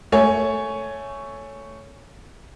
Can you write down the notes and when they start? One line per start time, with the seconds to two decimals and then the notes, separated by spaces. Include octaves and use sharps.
0.12 A3 C#5 G#5